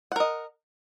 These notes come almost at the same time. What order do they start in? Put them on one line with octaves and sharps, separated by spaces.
F#5 A#4 D#5